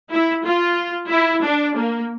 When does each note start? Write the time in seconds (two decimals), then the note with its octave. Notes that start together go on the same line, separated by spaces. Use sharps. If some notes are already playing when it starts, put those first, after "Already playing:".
0.12 E4
0.45 F4
1.10 E4
1.43 D4
1.76 A#3